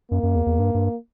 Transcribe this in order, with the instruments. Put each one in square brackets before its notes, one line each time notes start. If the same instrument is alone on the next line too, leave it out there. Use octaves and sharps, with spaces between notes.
[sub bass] F#2 [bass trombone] A#3
[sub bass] F#2
E2
E2
G2
G2